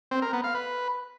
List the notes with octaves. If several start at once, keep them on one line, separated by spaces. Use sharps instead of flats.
C4
A#4
B3
F5
B4